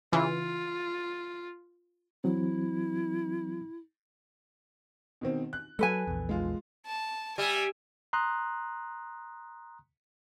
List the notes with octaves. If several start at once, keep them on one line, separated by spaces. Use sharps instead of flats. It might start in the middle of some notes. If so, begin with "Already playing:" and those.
C#3 E3 F4
E3 F#3 C4 E4
B2 D#3 C4
F#6
F#3 G#3 A4 B4 G#5
A#1 E2
G#3 F4
A5
G3 E5 G#5
A#5 C6 D#6 F#6